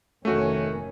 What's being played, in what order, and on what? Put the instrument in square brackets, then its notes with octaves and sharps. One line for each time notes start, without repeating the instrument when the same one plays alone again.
[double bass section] F1 D#3 C#4 [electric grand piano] A3 F#4